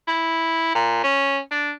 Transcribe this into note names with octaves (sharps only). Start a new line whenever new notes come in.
E4
A#2
C#4
D4